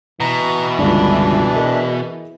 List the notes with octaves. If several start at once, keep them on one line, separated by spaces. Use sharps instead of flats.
B2 E3 A#5
G1 C#2 D4
G#4 A#4 D#5